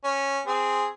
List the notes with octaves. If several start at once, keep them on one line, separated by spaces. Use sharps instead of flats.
C#4
C4 G#4